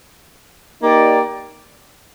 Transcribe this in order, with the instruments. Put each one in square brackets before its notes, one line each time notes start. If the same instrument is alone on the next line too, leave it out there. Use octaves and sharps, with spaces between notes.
[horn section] A#3 D#4 G4 D5